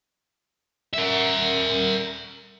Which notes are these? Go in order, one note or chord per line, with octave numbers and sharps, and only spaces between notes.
A#4 E5